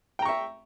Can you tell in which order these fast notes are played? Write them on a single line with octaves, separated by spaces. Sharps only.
G5 A#5 C#6 E5